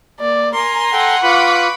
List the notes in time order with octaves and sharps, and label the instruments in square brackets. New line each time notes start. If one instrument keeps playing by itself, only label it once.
[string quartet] A#3 [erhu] D5
[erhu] A#4 [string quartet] G#5 A#5 C6
[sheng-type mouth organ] A4 G5 [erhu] F#5
[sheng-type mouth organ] F4 [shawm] B4 [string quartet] B5 C#6 D6